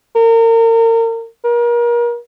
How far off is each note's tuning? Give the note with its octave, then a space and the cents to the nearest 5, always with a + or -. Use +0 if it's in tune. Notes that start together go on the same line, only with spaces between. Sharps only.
A#4 -35
A#4 +35